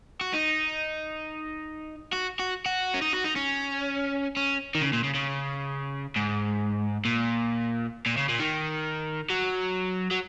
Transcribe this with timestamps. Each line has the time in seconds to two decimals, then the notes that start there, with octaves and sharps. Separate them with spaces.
0.21 F#4
0.33 D#4
2.13 F#4
2.39 F#4
2.66 F#4
2.94 C#4
3.02 D#4
3.13 F#4
3.24 D#4
3.36 C#4
4.37 C#4
4.75 D#3
4.81 C#3
4.93 A#2
5.04 C#3
5.14 C#3
6.16 G#2
7.05 A#2
8.06 A#2
8.17 C#3
8.29 A#2
8.39 D#3
9.30 F#3
10.11 F#3